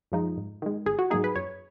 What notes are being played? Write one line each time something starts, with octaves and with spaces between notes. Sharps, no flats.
F#2 F3 G#3 D#4
G#2
D#3 G#3
G#1 G#4
F#4
G#2 F#3 A#3 D#4 G#4
B4
F#2 C#5